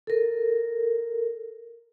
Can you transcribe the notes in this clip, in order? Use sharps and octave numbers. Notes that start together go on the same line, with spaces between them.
A4 A#4